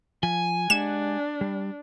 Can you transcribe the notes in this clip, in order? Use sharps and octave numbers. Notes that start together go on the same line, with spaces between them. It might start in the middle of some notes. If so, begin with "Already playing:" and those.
F3 G#5
G#3 D4 G4 F#5 E7
G3